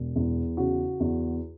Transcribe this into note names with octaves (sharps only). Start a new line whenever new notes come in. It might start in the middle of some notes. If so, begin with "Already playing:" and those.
Already playing: E1
E2
C#3 F#4
E2